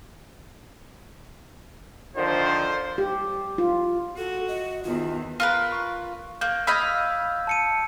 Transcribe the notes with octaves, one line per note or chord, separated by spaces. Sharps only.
D3 D#3 F3 C5
G4
F4
F#4 A4
D#5
E2 D#3 F4
F4 A#4 B4
C#6
A#3 G6
D#5 F5 B5 E6 G6 G#6
A5 C#7 D#7